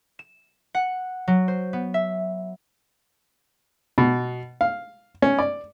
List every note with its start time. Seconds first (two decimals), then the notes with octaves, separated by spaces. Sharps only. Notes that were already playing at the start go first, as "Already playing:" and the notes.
0.19 E7
0.75 F#5
1.28 F#3
1.48 C5
1.73 B3
1.94 E5
3.98 B2
4.61 F5
5.22 C#4
5.39 D5